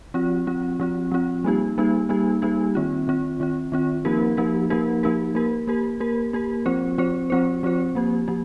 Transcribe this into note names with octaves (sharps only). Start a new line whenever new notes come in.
F3 C4 F4
F3 C4 F4
F3 C4 F4
F3 C4 F4
G3 A#3 D#4 G4
G3 A#3 D#4 G4
G3 A#3 D#4 G4
G3 A#3 D#4 G4
D#3 C4 F4
D#3 C4 F4
D#3 C4 F4
D#3 C4 F4
F3 A#3 D#4 G4 A#4
F3 A#3 D#4 G4 A#4
F3 A#3 D#4 G4 A#4
F3 A#3 D#4 G4 A#4
A#3 G4 A#4
A#3 G4 A#4
A#3 G4 A#4
A#3 G4 A#4
F3 C4 F4 C5
F3 C4 F4 C5
F3 C4 F4 C5
F3 C4 F4 C5
F3 A#3 G4
F3 A#3 G4